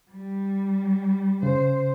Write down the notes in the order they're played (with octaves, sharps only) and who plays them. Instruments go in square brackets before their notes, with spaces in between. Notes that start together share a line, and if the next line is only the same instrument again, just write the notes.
[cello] G3
[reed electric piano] C#3 [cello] C5